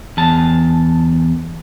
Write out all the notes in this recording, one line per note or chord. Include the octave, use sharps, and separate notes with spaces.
E2 A5